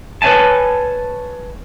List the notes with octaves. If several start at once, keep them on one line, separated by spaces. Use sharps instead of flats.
B4 C#5 E5 G#5 A5